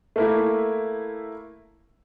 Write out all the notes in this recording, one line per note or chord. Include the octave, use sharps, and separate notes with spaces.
A3 A#3 E4